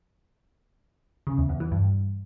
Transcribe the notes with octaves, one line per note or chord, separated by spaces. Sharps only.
C#3
E2
E2
E3
G2